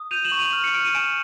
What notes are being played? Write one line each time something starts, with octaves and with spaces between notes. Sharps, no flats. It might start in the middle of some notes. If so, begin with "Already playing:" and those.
Already playing: D#6
G6 D#7 F7
E7 F#7
C#6
D#7 F7
F6
C#7
F6 D7
D#7
G#5 D7 E7